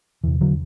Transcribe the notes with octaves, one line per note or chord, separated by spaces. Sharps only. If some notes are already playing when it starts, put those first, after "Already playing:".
E2 C3 E3
D3 F#3